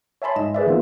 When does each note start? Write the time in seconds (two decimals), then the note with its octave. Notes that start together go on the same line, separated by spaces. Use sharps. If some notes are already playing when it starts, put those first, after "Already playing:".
0.22 C#5 E5 G#5 A5 B5 C6
0.36 G#2 D#5 E7
0.54 G#4 B4 D5 E5
0.66 D#3 E3 A#3 B3 F4